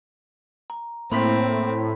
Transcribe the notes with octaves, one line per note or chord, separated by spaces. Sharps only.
A#5
A2 A#3 C4 B5 C6 B6